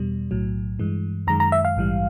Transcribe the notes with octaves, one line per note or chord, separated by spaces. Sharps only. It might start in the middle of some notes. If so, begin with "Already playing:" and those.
Already playing: E2 B2 G3
B1 A2 F#3
G2 E3 G#3
F#2 D#3 G#3 A#5
A#5
E5
F5
A#1 G#2 E3 G3